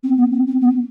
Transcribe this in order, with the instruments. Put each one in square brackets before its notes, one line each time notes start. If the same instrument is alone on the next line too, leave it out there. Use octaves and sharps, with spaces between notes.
[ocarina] C4
B3
C4
C4
B3